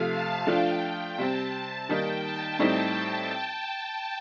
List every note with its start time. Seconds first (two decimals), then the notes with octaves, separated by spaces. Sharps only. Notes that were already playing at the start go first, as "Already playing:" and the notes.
Already playing: C3 F3 A3 F5
0.11 A5
0.46 F3 A3 D4 F4 G5
1.17 C3 G3 C4 A5
1.89 D#3 G3 A#3 D#4 G5
2.23 A5
2.59 A2 G3 C4 D#4 G4